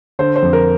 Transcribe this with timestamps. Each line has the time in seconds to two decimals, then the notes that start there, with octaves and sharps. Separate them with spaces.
0.19 D3 C5
0.36 C5
0.42 F2
0.53 A#4